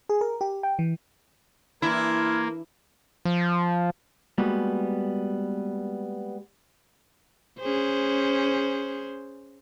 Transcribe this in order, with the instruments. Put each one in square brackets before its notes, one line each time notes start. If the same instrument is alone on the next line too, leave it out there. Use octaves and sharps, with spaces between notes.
[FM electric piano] G#4
A#4
G4
G5
E3
[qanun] E3 D4 [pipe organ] A#3 [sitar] E4 [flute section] C6 F6 G#6
[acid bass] F3
[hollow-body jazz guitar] G3 G#3 A#3 B3 F#4
[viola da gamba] C#4 G#4 C5